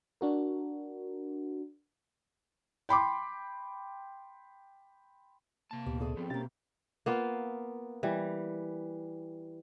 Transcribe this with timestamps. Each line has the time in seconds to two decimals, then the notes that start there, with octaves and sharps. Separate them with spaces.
0.21 D4 F#4 A#4
2.89 G5 B5 C6 D6
5.71 C3 A#3 A5
5.86 D2 A#2 B3 G4
6.00 G#4 A4 D5
6.17 F3 B3 C4
6.30 B2 A#3 C#4 G4 A6
7.06 A#3 B3 F4
8.03 E3 G3